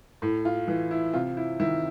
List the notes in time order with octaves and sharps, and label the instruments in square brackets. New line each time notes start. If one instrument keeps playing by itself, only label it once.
[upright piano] A2
F4
E3
E4
C3 F4
E4
D#3 E4